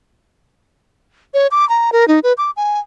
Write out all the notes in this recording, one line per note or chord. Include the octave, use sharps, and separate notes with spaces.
C#5
D6
A#5
A#4
D#4
B4
D6
G#5